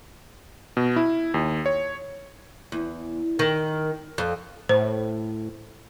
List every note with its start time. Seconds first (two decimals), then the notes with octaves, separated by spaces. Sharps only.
0.77 B2
0.96 E4
1.34 D#2
1.66 C#5
2.72 E2
3.39 D#3
4.18 F2
4.69 A2 C5